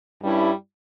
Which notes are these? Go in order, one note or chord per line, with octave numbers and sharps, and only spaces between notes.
G2 G3 C#4 E4